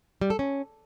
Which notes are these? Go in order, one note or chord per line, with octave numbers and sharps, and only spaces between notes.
G3
A4
C#4